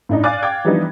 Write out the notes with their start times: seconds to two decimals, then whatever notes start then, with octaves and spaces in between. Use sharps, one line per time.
0.09 A2 D4 D#4
0.24 D5 F5 G#5 D6 F#6 A6
0.42 F5 G5 D6 G#6
0.65 E3 F3 G3 B3 D4 D#4